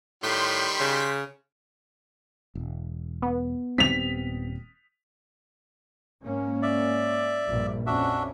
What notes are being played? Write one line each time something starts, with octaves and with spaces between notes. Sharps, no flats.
A2 D#3 G3 C6 G6 B6
C#3
E1
B3
D#1 G3 C4 B6 F7
G#2 A#3 C#4
D5 E5
A#1 G2
F2 C#4 D4 F#4 E5